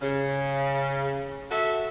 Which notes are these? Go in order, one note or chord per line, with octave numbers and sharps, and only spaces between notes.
C#3
F#4 A4 E5